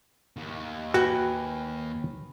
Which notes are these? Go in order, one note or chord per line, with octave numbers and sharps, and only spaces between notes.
D#2
F#4 B4 G5 G#5